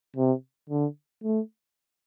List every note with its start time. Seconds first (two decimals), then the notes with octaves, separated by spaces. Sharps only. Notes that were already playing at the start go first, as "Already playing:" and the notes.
0.16 C3
0.70 D3
1.24 A3